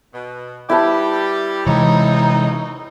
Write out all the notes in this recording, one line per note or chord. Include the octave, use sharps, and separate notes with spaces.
B2
G3 E4 G4 B4 A5
C3 E3 G3 G#3 C4 D#4 C#5